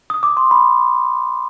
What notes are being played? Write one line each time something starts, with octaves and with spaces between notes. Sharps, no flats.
D#6
D6
C6
B5